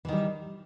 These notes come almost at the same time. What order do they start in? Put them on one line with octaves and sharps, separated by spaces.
E3 D#3 G3